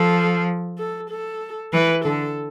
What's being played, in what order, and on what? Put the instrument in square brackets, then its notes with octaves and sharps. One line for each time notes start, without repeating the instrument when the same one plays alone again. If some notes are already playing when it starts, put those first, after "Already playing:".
Already playing: [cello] F3 [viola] A4
[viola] A4
A4
[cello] E3 [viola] B4
[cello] D3 [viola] A4